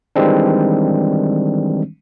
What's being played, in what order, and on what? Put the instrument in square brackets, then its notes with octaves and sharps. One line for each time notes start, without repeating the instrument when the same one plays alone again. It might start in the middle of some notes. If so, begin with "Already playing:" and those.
[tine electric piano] D#3 E3 G3 G#3 C4 D4